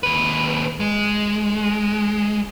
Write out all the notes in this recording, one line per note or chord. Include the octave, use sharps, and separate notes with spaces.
D#2 B4
G#3